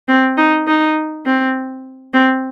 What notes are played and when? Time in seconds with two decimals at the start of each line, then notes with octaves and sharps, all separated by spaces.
0.08 C4
0.37 D#4
0.67 D#4
1.26 C4
2.14 C4